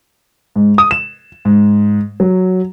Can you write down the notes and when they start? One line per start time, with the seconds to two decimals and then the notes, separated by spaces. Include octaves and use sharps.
0.56 G#2
0.78 D#6
0.91 E7
1.45 G#2
2.20 F#3